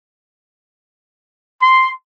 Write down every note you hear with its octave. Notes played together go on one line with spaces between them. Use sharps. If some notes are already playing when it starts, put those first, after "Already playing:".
C6